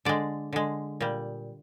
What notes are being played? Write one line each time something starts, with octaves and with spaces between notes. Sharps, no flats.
D3 G#3 D5
D3 G#3
A#2 G3